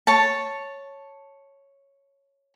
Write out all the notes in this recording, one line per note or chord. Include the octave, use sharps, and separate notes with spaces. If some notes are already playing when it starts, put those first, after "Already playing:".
C#5 A5